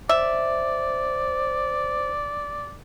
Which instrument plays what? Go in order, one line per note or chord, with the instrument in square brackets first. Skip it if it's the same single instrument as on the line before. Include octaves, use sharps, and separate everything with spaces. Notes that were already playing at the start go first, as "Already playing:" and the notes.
[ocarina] C5 [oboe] D5 [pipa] E5